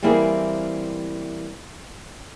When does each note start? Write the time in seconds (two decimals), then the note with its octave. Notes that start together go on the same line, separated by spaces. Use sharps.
0.03 E3 G3 A#3 C4 E4 G#4